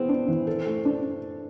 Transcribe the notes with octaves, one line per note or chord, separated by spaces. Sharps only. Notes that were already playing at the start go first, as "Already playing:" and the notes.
Already playing: E3 B3 C4 G#4
D4
E3
A4
A3
D4